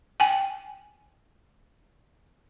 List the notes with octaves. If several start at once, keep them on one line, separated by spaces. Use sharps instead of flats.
G5 G#5